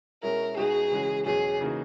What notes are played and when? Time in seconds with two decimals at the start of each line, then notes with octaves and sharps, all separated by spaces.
0.23 B2 G#3 C#4 E4 A#4
0.57 B2 G#3 D#4 F#4 G#4
0.91 C#3 E3 G#3 C#4 F#4
1.26 E2 B2 F#3 C#4 G#4
1.61 C#3 E3 A#3 D#4 F#4